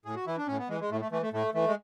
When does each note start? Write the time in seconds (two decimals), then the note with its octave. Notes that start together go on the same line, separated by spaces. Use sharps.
0.05 A2 G#4
0.16 F#4
0.27 E3 E4
0.37 D4
0.47 A2 C#4
0.59 B3
0.69 E3 G#3
0.80 G#3
0.91 A2 A3
1.01 A3
1.12 E3 A3
1.22 A3
1.33 A2 A3
1.54 E3 A3
1.68 G#3